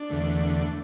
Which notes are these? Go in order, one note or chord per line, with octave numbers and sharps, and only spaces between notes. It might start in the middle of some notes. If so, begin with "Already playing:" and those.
Already playing: D4
E2 D3 A3